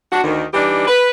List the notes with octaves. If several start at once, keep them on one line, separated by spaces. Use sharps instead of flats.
D4 F#4
D2 D#3
E3 G3 D4 D#4 G4
B4